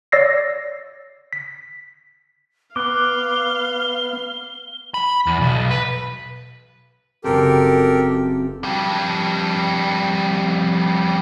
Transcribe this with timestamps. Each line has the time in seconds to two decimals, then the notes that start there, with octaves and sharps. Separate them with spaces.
0.12 C#5 D5 E6 A#6 C7
1.33 B6
2.76 B3 F5 D6 F#6 G7
4.94 B5
5.27 E2
5.41 B1
5.71 B4
7.24 F#1 C4 G4 A4 A#4
8.64 F2 G3